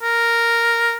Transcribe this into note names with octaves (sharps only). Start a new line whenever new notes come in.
A#4